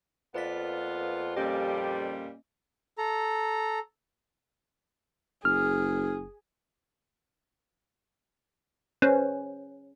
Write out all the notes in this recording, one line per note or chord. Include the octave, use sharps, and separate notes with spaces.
F2 A#3 B3 F4 B4 D5 B6
A#2 G3 A#3 C#4 G4 D#5
A4 A#5
F#1 G#4 F6
C#4 B4 C5